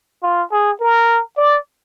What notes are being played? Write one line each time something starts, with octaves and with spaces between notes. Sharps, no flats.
F4
G#4
A#4
D5